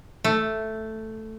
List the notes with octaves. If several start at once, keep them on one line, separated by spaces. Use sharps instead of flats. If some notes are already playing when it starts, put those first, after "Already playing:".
A3